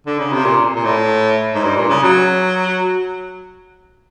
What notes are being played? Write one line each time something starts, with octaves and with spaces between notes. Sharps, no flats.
D3
C#3
C3
A#2
A#2
A2
G#2
G2
A#2
C#3
F#3